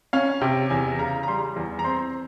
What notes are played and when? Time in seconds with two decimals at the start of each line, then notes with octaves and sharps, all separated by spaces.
0.13 C#4 F5
0.41 C3 G5
0.70 E2 G#5
0.99 C#3 A#5
1.23 A#5
1.27 G3 C6
1.56 E2
1.79 A#5
1.84 C4 C6